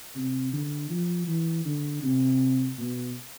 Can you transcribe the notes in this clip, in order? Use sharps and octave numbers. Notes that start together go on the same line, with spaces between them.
C3
D3
F3
E3
D3
C3
B2